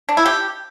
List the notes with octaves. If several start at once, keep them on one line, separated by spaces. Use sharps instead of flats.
D4
E4
G4